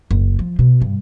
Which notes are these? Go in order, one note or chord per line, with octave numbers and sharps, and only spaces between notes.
F#1
F3
B2
G2